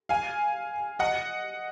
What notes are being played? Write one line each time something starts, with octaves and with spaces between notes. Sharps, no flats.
F5 G#5
D#5 F#5